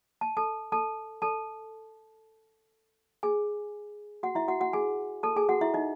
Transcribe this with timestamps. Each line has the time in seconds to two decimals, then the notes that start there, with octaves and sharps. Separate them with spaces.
0.21 A5
0.37 A4 A5
0.72 A4 A5
1.22 A4 A5
3.23 G#4 G#5
4.23 F#4 F#5
4.35 E4 E5
4.48 F#4 F#5
4.61 F#4 F#5
4.73 G#4 G#5
5.23 A4 A5
5.36 G#4 G#5
5.49 F#4 F#5
5.61 E4 E5
5.74 D#4 D#5